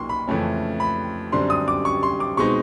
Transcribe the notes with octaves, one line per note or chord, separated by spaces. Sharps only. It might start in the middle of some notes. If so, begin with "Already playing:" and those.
Already playing: B1 A#2 F3 A#3 D#4 C6 C#6
B5
F2 C#3 E3 A3 C#4
B5
F#2 D3 G3 C4 C6
D#6
D6
C#6
C6
D6
B2 G#3 C4 D#4 C#6